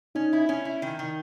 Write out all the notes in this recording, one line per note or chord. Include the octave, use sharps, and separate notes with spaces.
C#4 D#4
E4
C#4
E4
D#3
D#3